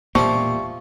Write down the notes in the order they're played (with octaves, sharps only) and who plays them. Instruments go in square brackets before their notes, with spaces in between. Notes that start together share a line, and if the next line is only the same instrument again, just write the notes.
[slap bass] E1 A#2 A#3 [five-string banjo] F3 [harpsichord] G3 E4 [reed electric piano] C#6